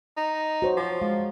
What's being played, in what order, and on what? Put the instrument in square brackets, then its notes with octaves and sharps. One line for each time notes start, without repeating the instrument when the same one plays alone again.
[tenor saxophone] D#4
[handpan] F#4 C5 C#5
[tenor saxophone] F3
[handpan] G#3 F5